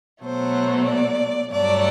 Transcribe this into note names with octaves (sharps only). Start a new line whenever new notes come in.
B2 F#3 A3 C5
D5
G2 F#3 A3 D5